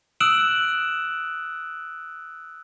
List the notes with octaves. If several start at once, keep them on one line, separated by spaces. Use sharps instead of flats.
D#6 E6 F#6 D7 E7 F#7